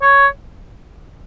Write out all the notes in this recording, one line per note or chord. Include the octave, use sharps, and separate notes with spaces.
C#5